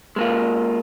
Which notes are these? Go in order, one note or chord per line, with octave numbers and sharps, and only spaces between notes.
G#3 A#3 F4